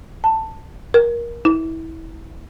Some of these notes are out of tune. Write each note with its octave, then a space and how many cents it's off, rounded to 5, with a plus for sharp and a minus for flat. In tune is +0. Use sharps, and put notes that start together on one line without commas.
A5 +10
A#4 +20
E4 -25